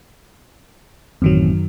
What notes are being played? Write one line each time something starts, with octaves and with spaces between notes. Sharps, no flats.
A1 F#2 D#3 F#3 C4